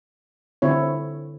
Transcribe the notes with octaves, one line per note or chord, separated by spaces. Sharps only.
D3 C4 E4 C#5